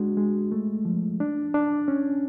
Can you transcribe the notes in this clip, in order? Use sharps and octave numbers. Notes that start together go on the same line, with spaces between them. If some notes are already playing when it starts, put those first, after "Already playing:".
Already playing: G#3 D4 F#4
G#3
A3
F3
D4
D4
C#4